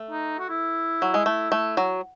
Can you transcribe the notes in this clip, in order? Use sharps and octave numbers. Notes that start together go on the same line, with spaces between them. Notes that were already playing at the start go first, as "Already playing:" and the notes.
Already playing: A3
D#4
F#4
E4
F#3
G#3
A3
A3
F#3